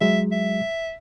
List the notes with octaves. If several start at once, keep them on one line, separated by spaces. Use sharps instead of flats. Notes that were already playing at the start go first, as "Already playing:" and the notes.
F#3 G#3 E5
E5